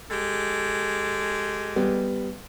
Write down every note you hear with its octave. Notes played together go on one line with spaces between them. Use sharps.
G#3 G4 A4
G3 B3